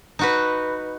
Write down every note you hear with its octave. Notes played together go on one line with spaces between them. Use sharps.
D#4 F#4 B4